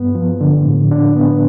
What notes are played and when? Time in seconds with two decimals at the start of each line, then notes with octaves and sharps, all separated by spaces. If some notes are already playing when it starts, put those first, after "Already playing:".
Already playing: G2 B3
0.15 F3
0.41 D3
0.65 A2
0.91 D4
1.16 B3